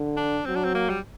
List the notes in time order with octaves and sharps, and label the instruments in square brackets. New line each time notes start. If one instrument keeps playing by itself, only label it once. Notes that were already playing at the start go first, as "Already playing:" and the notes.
Already playing: [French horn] D3
[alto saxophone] D4
[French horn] F#3 [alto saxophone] C4
[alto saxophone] D4
C4
A#3
G3